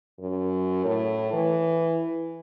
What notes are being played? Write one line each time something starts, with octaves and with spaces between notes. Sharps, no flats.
F#2
A2
E3